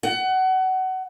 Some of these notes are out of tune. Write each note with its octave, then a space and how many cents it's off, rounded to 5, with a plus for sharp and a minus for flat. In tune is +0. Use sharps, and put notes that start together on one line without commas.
F#5 +25